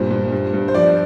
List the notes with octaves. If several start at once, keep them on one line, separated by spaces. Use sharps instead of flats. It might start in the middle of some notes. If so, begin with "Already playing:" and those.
Already playing: G2 A#2 C5
G2
G2
G2
C5
F3 D5